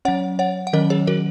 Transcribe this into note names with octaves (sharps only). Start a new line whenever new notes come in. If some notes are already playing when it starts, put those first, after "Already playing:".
F#3 C#4 C#5 F#5
C#5 F#5
F#5
D#3 F#3 C#4 A#4 D#5
G#4 C#5
F#4 A#4